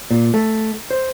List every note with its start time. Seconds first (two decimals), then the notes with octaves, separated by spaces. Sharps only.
0.11 A#2
0.34 A3
0.91 C5